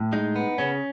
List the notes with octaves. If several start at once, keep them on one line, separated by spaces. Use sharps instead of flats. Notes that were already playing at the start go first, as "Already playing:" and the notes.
Already playing: A2
G#3 D#4
B3
C#3 C#4